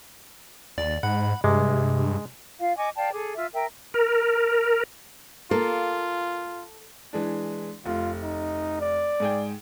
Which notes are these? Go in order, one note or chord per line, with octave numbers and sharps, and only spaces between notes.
D#2 D5
G#2 F#5 B5
G2 C3 G#3
F4 F5
D#5 G#5 C#6 D6
D5 F5 G5 A5
G#4 A4 D6
F4 E5
A#4 E5 G5
A#4
A#3 F4 A4
E3 G#3 D4
F1 F4
D#4
D5
G#2 G#4 G5